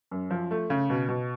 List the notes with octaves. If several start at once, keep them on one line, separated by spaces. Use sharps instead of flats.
F#2
F3
A3
C#3
B2
B2